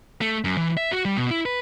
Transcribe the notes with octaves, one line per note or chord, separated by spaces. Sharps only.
A3
F#2
E3
E5
F#4
G3
B2
E4
B4